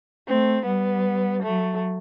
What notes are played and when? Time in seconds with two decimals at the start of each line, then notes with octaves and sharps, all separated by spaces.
0.28 A3 C4
0.66 G3 B3
1.43 F#3 A3